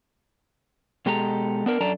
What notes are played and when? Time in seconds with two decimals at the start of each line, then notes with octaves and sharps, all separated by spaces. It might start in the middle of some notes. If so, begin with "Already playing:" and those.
1.06 B2 G#3 G4 A4 A#5
1.66 B3 D4 A#4
1.80 F#2 D4 A4 D5 A5 A#5